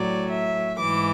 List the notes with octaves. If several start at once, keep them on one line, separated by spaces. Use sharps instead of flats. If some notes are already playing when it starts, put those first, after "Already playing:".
Already playing: A2 F#3 D5
E5
G#2 E3 D6